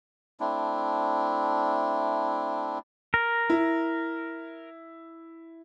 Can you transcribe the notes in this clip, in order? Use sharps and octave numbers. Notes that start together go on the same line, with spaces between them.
A3 C4 D4 E4
A#4
E4